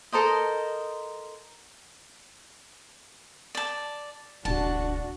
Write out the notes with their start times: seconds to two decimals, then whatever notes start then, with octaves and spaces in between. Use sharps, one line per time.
0.12 A4 A#4 C5 D#5
3.55 D5 A5
4.45 D#1 C#2 D4 F#4 A5